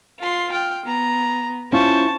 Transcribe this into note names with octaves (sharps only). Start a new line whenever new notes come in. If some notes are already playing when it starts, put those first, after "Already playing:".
F4 C6
G5 F6
B3 A#5
C#4 E4 F4 C5 A5 C#6